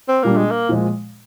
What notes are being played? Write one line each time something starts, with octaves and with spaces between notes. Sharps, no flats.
C4
A#2 G3 A#3 D4
G#3
A#3
A#2 F3 G#3